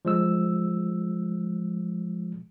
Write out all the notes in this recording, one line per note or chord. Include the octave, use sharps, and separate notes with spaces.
F3 G#3 E6